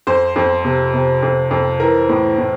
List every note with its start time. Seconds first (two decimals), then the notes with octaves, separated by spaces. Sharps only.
0.07 F2 C5
0.36 F2
0.65 C3
0.94 C3
1.23 F2
1.51 F2
1.80 E3 A#4
2.09 A2
2.38 A2